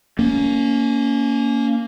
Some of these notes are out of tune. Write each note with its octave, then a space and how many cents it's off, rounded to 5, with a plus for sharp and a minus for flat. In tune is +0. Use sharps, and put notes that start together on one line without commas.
A#3 -5 C#4 +20